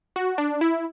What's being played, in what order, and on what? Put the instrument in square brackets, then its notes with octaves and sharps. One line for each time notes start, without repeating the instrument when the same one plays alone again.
[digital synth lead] F#4
D4
E4